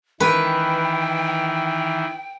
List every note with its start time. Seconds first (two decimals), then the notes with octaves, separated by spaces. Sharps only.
0.20 D#3 E3 B4 G5